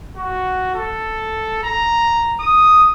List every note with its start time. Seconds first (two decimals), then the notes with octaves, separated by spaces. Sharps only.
0.17 F#4
0.75 A4
1.63 A#5
2.40 D#6